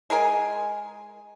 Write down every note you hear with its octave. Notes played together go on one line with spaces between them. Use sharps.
G#3 G#4 A#4 G#5